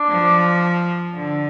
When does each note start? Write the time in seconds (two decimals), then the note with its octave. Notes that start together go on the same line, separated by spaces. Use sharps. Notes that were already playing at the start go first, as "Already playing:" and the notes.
Already playing: D4
0.09 F3
1.15 D3